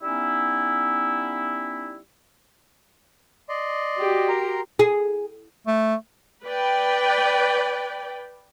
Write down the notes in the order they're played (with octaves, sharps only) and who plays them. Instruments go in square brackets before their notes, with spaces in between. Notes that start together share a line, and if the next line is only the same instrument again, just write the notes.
[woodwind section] G3 B3 C#4 D#4 E4
[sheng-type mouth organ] D5 D#5 C6
[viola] F#4 G4
[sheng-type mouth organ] A#4 A#5 C6
[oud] G#4
[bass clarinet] A3
[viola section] B4 D5 G5